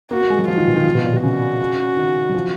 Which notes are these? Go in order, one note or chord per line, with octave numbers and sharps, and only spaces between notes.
A#3 F#4
A#3
G#3
F#3
F3 F4
D#3
B2
D#3
F3
B2
A#2
B2
C#3 F#4
D#3
F#3
F3